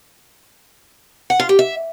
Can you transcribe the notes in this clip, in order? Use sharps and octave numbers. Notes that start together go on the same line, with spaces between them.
F#5
F4
G4
E5